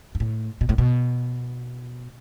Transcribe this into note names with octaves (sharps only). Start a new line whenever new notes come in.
G2
A2
B2
A2
B2